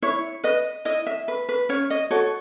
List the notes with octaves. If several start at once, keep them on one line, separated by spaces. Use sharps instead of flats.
E4 C#5
B4 D#5
E4 D#5
E5
B4
B4
C#4 C#5
D#5
F#4 A4 C#5